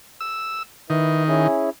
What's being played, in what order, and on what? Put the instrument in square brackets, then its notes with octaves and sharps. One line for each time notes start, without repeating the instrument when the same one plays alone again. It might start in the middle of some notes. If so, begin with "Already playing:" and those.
[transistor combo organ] E6
[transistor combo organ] D#3 [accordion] E4 B4
[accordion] C#4 E4 G#4